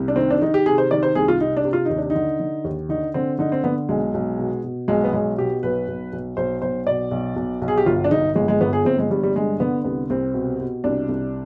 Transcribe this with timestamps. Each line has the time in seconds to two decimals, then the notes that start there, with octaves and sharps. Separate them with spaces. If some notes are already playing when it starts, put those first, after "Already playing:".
Already playing: C2
0.08 D4
0.16 D#3 C4
0.30 D4
0.42 D#3 D#4
0.54 G4
0.66 C3 G#4
0.78 C5
0.91 D#3 D5
1.03 C5
1.15 C2 G#4
1.28 F4
1.40 C3 D#4
1.57 D4
1.65 C3
1.73 F4
1.85 D#2 D#4
1.98 D4
2.10 D3 D#4
2.40 D3
2.64 D#2
2.89 D3 D#4
3.14 D3 C4
3.39 D3 D#4
3.52 C4
3.64 D3 B3
3.89 B1 G#3
4.14 B1
4.39 B2
4.64 B2
4.88 B1 G#3
5.04 B3
5.13 B1 G#3
5.38 B2 G4
5.63 B1 B4
5.88 B1
6.13 B1
6.37 B1 C5
6.62 B1 C5
6.87 B2 D5
7.11 B1
7.36 B1
7.62 B1
7.68 G#4
7.78 G4
7.86 G1 F4
8.04 D4
8.11 G1 D#4
8.36 G1 G#3
8.48 G#3
8.61 G1 B3
8.73 G#4
8.85 G1 C4
8.98 G#3
9.11 G2 G3
9.23 G3
9.36 D3 G#3
9.60 D3 B3
9.84 C2 B3
10.10 C2 C4
10.34 B2
10.60 B2
10.84 C2 D4
11.09 C2